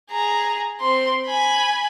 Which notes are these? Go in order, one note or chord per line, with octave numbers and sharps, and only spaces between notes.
G#4 A#5
C4 C6
G#5 B5